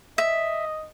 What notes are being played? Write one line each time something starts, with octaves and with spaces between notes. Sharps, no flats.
D#5 E5